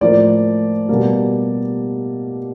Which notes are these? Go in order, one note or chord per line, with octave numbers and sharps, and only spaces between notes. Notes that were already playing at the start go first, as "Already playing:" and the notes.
A2 F3 A#3 D5
B2 G3 A#3